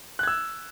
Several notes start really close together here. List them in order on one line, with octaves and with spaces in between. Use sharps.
F#6 G#6 E6